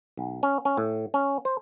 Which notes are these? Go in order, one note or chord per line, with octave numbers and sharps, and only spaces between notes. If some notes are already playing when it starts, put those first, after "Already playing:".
B1
C#4
C#4
A2
C#4
C5